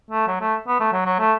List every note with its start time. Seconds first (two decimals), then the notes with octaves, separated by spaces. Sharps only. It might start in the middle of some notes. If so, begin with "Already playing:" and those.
0.11 A3
0.28 F#3
0.41 A3
0.67 B3
0.80 A3
0.92 F#3
1.06 F#3
1.19 A3